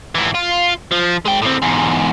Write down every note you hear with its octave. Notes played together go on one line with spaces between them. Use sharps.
G#2 E3
F4
F3
G#3 G5
A2 C4
E2 G#2